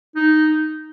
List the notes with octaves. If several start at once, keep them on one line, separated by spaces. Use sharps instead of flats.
D#4